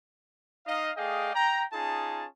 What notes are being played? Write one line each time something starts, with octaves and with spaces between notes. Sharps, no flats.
D#4 D#5 F5
A3 G#4 D5 D#5 F5 G5
G5 A#5
C#4 D#4 F4 G#4 A5